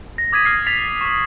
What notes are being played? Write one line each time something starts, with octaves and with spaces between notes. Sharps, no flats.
A#6
D6 D#6 G#6 A#6 B6 D#7
F6 C7
A6 B6 F7
C#6 D#6